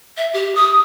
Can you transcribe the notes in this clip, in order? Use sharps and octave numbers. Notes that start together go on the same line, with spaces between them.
E5
G4
D#6